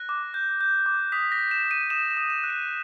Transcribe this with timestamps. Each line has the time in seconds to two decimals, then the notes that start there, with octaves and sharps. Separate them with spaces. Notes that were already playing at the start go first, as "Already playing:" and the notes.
Already playing: F#6 A#6
0.09 D6
0.34 G6
0.61 G6
0.86 D6
1.12 D#6 B6
1.32 A#6
1.39 G6
1.51 E7
1.65 D#6
1.71 D#7
1.90 D#6 E7
2.11 E7
2.17 D#6
2.30 E7
2.44 F#6
2.50 D#7